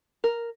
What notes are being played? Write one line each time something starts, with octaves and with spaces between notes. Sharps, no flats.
A#4